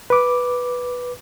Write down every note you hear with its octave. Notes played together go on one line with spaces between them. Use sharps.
B4 D6